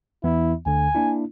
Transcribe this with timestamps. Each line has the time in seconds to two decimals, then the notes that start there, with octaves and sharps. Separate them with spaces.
0.24 E2 E3 B3 E4
0.66 D2 D3 G#5
0.95 A#3 D4 E4